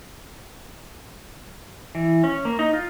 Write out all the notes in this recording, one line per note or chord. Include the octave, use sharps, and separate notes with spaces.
E3
C#4
A#3
D#4
F4